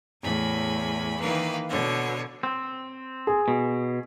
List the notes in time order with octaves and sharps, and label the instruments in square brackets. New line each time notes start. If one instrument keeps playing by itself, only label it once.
[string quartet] E2 A2 G#5 B5
D#3 E3 A#3 B4 F5
B2 D3 C#5
[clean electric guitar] C4
[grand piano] G#4
[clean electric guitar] B2